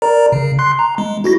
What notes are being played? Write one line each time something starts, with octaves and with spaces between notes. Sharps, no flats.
A#4 D5 A#5
C#3
C6 F#6 C7
A#5
G#3
E4 F#4 A#6